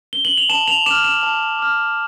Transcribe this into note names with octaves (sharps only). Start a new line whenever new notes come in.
G7
F#7
F7
A5 E7
F7
D6 F6 E7
E7
A5
D6 F6